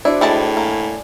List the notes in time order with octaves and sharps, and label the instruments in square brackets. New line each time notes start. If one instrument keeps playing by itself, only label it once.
[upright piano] D4 [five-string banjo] E4 [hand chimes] F#4 C5 D6
[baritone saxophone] A2 [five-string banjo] G#3 E4 A5 [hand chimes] G#4 D#5 G5
[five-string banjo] A#3 [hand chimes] G#5